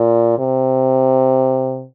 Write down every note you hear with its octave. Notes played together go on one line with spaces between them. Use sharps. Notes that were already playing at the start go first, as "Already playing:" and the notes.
Already playing: A#2
C3